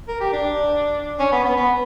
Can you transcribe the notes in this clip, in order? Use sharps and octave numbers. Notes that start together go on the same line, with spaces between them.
A#4
G4
D4
C#4
B3
B3
B3